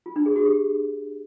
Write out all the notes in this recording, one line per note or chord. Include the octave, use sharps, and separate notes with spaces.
F4
D4
G#4
F#4
G4